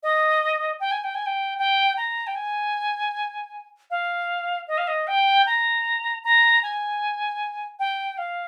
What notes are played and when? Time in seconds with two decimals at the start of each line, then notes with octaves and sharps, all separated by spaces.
0.03 D#5
0.80 G5
0.91 G#5
1.04 G5
1.14 G#5
1.26 G5
1.58 G5
1.97 A#5
2.27 G5
2.35 G#5
3.90 F5
4.68 D#5
4.77 F5
4.87 D#5
5.07 G5
5.46 A#5
6.24 A#5
6.62 G#5
7.79 G5
8.17 F5